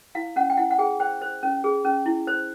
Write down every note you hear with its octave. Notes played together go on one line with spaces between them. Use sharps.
E4 F5
C#4 F#5
G5
E4 F#5
F#5
G#4 G5
C5 G5
C5
C#4
G#4
C#4
E4
C5